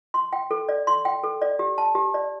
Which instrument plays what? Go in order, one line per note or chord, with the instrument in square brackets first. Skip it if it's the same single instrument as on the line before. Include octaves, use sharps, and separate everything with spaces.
[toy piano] C6
G5
A4
D5
C6
G5
A4
D5
G4
A5
G4
D5